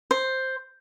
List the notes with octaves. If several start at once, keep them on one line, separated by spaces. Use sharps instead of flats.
C5